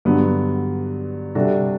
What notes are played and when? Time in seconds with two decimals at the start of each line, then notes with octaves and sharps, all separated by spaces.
0.05 G2 D3 F#3 B3
1.35 C3 G3 D4 F#4 A4